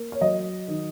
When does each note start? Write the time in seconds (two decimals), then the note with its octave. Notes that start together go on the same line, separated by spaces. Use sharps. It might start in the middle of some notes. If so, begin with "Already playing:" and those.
Already playing: A#3
0.12 C#5
0.21 F#3 D#5
0.68 D#3